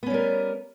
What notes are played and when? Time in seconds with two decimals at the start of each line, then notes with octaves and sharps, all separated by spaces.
0.03 B3
0.06 C#4
0.10 G3
0.14 A#4